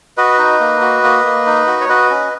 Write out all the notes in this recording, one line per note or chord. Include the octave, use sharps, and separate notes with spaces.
F#4 B4 D#5
D#4
A#3
F#4
A#3
A#3
D#4
F#4
C#5
F#4 B4 D#5
C#4